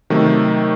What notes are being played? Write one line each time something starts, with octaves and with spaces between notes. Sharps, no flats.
C3 D#3 F#3 A3